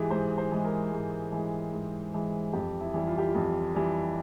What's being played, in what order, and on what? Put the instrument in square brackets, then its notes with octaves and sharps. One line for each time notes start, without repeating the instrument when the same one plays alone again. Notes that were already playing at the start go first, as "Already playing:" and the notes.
Already playing: [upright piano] G#2 E3 G#3 G4 G#4
G#2 C5
C5
E3 G#3
A#4
G#2
E3 G#3
G#2
E3 G#3
F2 G4
E4
E3 G3
F4
G4
F4
F2
E3 G3